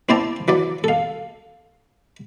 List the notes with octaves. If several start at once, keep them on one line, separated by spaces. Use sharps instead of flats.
C4 E4 C5 D5 A5 A#5
E3 F#3 D5
A4 F5